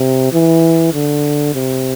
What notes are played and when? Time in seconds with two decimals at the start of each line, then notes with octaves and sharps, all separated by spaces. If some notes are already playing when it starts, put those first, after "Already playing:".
Already playing: C3
0.33 E3
0.93 D3
1.54 C3